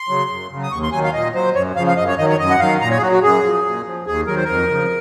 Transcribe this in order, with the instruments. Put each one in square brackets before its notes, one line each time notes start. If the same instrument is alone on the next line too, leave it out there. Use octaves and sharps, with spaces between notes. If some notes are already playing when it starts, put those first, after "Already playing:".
Already playing: [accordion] C6
C#3 F#3
F#2
C#3
F#3
D#6
D#2 C#6
C6
D#3 F#3 G#5
F5
A#2 D#5
F#3 C5
F#2 C#5
C#3 F3 F5
F5
F#2 D#5
C#5
D#3 F#3 D#5
C#5
F#2 D#5
F#5
D#3 F#3 F5
A#2 A#5
C#5
G#4
F#3 F#4
F#4
F#2 G#4
F3
A#2
F3
D#2 G#4
D#3 F#3 A#4
C5
F2 A#4
C#3 F3